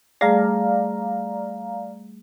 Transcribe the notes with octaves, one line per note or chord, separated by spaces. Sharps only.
G3 A3 G#4 D5 F5 A#5